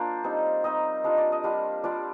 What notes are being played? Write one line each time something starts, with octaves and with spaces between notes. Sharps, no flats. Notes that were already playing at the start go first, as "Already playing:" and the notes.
Already playing: A#3 D4 F4 C5 D5
G3 C4 D#4
G3 C4 D#4 D#5
G3 D4 F4 D#5
D5
D#5
G3 D4 F4
G3 D4 F4 D5